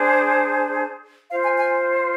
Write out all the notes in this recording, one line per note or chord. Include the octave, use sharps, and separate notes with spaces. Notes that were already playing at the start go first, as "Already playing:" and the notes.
Already playing: D4 G#4 C5
F4 C5 F5
G#5
G#5